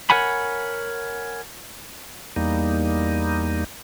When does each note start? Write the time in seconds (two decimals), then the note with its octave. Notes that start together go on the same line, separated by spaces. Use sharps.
0.10 A#4 C#5 F#5 G#5 B5
2.36 E2 G3 A#3 D#4